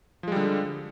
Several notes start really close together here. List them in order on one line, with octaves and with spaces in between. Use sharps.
F3 G#3 G3 D3